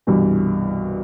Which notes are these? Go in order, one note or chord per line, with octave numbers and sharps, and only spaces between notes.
C2 G2 B2 E3